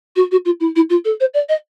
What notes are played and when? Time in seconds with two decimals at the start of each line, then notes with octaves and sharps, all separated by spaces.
0.16 F#4
0.31 F#4
0.45 F4
0.60 E4
0.76 E4
0.90 F4
1.05 A4
1.20 C5
1.34 D5
1.49 D#5